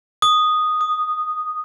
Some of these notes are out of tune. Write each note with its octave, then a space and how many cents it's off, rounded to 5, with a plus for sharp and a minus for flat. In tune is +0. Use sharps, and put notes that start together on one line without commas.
D#6 -5
D#6 -20